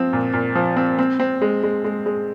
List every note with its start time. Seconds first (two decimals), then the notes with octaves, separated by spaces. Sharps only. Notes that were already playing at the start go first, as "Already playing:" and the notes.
Already playing: F3 C4
0.13 A#2
0.33 A#2
0.55 F3
0.77 C4
0.99 C4
1.20 C4
1.42 G#3
1.63 G#3
1.84 G#3
2.06 G#3